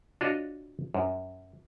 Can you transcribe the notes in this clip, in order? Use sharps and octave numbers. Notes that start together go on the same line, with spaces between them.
D4 F4 F#4 C#5 D#5
F#2